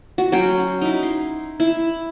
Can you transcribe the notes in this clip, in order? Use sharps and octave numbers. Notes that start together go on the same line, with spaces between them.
F#4
F#3 C#4 G5 C6
D#4 E4
C6
E4